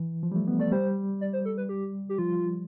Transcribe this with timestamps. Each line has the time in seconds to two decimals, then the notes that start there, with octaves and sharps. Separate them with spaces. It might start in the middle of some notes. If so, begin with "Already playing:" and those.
Already playing: E3
0.23 F3
0.32 G3
0.36 A3
0.47 B3
0.60 A3 D5
0.72 G3 C5
1.21 D5
1.33 C5
1.45 A4
1.58 B4
1.69 G4
2.09 G4
2.18 F3 F4